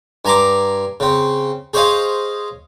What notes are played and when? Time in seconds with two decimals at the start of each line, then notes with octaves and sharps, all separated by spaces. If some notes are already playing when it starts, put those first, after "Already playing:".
0.25 G2 G#5 A#5 C6 D6
1.00 C#3 C4
1.74 G#4 C5 C#5 D#5 F5 G#5